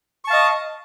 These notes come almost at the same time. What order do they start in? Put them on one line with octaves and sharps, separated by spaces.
C#6 A5 F5 D#5